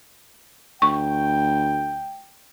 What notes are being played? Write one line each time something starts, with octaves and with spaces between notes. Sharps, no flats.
D2 G5 C#6